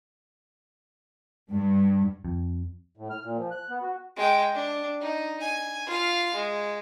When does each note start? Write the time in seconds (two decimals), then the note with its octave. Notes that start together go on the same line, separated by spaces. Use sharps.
1.51 G2
2.25 F2
2.97 A2
3.10 F6
3.23 A#2
3.37 F3
3.51 F#6
3.70 B3
3.82 F#4
4.17 G#3 G5
4.54 D4
5.01 D#4
5.41 G#5
5.87 F4 F5
6.34 G#3